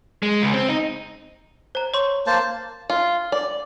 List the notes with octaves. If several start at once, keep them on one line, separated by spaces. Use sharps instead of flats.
G#3
C#2
C4
D#4
C5 A#5
C#5 C6 C#6
A#3 C5 A5
F4
D5